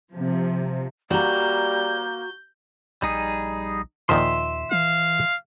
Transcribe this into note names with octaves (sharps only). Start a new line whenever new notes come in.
C3 F3
G3 A#3 F#4 A#5 G6
A#1 G3 D#4 G#4
D#2 A#2 D#3 F3 E5 C6
E3 F5